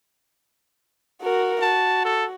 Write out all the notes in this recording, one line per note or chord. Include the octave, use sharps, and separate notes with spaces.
F#4 A#4
F#4 A5
A4